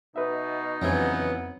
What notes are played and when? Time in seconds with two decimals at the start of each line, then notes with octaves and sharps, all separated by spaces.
0.16 B2 D#4 B4 E5
0.82 F2 C#3 E3 F#3 B3 C4 G#6